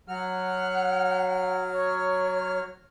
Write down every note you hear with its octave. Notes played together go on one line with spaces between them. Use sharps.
F#3 F#5 F6
C#5